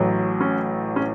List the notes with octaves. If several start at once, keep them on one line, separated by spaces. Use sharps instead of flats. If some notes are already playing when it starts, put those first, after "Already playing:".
Already playing: A1 A2 F#3
C#4
C#4